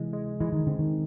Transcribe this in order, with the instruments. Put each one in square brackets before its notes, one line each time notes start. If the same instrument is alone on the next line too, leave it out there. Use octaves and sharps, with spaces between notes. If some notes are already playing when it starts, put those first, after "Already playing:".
Already playing: [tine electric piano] C3 G#3 [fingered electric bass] E3
[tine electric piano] G#3
[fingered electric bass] E3 [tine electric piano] G#3
[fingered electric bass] D#3
[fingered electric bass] D3 [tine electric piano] C4
[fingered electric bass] D#3